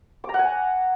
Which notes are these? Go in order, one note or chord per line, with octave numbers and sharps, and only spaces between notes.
D6
A#5
F#5
G#5